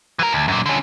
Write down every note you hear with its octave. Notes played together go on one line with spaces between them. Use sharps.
E3 A#4
D2
F#2 A#2
D3 C#4